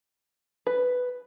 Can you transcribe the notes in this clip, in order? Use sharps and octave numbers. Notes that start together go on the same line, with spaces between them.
B4